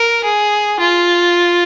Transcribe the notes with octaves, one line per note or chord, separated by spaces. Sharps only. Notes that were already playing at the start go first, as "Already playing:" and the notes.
Already playing: A#4
G#4
F4